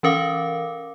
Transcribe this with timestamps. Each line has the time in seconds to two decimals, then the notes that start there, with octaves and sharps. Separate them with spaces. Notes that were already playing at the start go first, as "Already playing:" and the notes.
0.03 E3 C#4 A#4 F5 D6